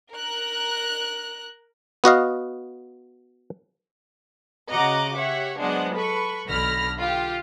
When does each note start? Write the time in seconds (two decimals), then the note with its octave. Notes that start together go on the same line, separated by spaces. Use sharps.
0.12 A#4 F#6
2.04 B3 F#4 D#5 F5
4.70 C#3 F#4 D#5 F#5 A#5 D6
5.16 G4 C#5 E5 F#5
5.58 F#3 G#3 B3 D4 C5 F#5
5.94 A4 B4 B5 C#6
6.47 B1 D3 B5 F6 A#6
6.97 F4 G4